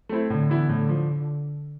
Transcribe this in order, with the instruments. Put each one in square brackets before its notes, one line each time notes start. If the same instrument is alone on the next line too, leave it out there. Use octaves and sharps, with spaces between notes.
[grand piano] A3 C4 E4
[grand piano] A2 [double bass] D3
[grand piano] E3 B3 E4
[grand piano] A2 [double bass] D3
[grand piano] F3